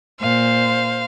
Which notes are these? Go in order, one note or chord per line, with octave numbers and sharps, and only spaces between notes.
A#2 C5 F5